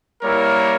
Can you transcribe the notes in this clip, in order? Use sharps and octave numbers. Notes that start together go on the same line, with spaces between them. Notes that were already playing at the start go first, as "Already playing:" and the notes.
G3 A#3 E4 A#4 C#5